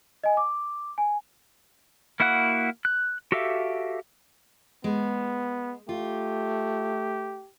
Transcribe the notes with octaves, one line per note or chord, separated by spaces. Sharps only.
D#5 G#5
D6
G#5
A#3 E4 F#4 F#5 F#6
F#6
F#4 G4 A4 E5 F5
G#3 B3
A3 F4 G4